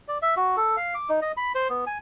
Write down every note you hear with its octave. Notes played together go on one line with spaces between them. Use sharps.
D5
E5
F#4
A4
F5
D6
D#4
D#5
B5
C5
B3
G#5